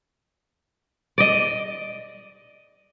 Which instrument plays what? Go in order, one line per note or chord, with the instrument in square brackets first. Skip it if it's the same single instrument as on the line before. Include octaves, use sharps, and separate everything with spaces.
[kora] D5 D#5